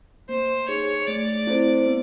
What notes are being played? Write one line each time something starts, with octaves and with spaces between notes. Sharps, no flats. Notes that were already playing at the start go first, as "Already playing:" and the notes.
A#3 C5
D#4 G#4 C#5
A3 D5
C4 E4 A4 C5
B3